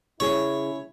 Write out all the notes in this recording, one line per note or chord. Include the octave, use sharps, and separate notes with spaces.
C#3 E4 G#4 C#5